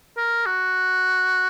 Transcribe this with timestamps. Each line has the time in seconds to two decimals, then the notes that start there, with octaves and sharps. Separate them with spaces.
0.17 A#4
0.46 F#4